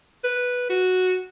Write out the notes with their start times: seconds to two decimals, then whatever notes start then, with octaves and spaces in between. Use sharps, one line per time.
0.24 B4
0.70 F#4